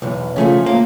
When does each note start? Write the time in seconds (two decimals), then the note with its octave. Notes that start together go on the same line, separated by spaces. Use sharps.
0.02 B1 E2
0.36 C#3 F3 A3 C#4
0.66 A#3